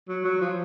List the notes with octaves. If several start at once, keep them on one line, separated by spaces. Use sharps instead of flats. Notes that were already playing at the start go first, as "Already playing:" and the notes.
F#3
F#3
F3